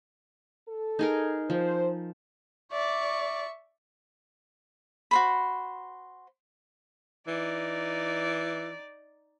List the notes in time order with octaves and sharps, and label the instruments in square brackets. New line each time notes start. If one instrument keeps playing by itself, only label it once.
[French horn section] A4
[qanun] D#4 G#4 A#4
[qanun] F3 [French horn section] C5
[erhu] D5 [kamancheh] E5 C#6
[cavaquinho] F#4 C5 B5
[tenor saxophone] E3 [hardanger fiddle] D#4 D5